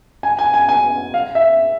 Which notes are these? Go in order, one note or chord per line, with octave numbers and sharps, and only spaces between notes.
G#5
G#5
G#5
G#5
F5
E5